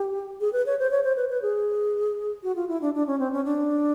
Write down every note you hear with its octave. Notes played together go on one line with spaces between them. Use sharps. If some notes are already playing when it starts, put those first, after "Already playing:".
Already playing: G4
G#4
B4
C#5
C5
C#5
C5
B4
B4
G#4
F#4
F4
E4
D4
D4
C#4
C4
C#4
D4